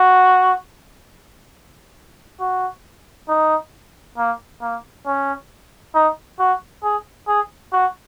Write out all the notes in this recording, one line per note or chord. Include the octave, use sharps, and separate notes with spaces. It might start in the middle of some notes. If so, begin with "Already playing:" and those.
Already playing: F#4
F#4
D#4
A#3
A#3
C#4
D#4
F#4
G#4
G#4
F#4